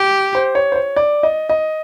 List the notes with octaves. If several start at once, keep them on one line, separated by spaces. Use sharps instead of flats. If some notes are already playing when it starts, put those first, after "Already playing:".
Already playing: G4
C5
C#5
C5
C#5
D5
D#5
D#5